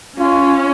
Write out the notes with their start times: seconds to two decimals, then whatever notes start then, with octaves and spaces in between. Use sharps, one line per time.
0.19 C#4 F4